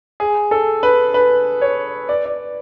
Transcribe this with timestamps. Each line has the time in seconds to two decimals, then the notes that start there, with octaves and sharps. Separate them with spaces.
0.20 G#4
0.51 A4
0.83 B4
1.14 B4
1.61 C#5
2.09 D5
2.26 D5